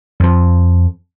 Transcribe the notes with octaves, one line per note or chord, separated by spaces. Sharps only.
F2 F3